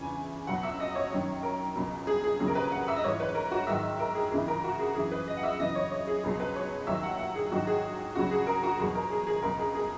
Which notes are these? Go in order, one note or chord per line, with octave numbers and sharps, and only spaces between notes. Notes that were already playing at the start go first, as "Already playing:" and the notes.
Already playing: E2 C#3 E3 G#5
C#2 B2 F#3 F#5
E5
D#5
C#5
F#2 D#3 F#3
A#4
C#2 B2 F#3
G#4
G#4
D#2 C#3 F#3 G#4
A#4
B4
F#5
E5
D#5
G#2 E3 C#5
B4
A#4
F#4
G#2 D#3 F#3 E5
A#4
G#4
C#2 C#3 E3 G#4
A#4
F#4
G#4
F#2 E3 G#4
B4
D#5
F#5
E5
F#2 C#3 E3 D#5
C#5
C#5
G#4
C#2 B2 F#3 G#4
B4
C#5
D#2 D#3 F#3 E5
F#5
F#5
G#4
G#2 D#3 F#3 F#4
G#4
C#2 C#3 F#3 F#4
G#4
A#4
F#4
E2 B2 F#3 G#4
A#4
G#4
G#4
C#2 B2 F#3 A#4
G#4
G#4